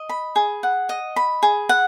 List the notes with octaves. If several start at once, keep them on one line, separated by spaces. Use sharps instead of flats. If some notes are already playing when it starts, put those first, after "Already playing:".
Already playing: D#5
B5
G#4
F#5
D#5
B5
G#4
F#5